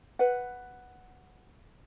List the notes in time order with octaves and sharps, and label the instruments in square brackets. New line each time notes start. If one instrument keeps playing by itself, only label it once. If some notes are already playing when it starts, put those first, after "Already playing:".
[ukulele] B4 F#5